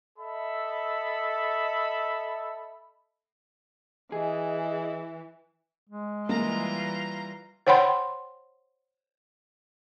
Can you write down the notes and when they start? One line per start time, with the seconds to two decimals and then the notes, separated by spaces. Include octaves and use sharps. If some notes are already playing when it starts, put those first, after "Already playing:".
0.17 A4 D#5 E5 B5
4.12 E3 G#4 D#5
5.90 G#3
6.29 E3 G3 A#3 F4 A#5
7.67 C5 C#5 F#5 G5 B5 C6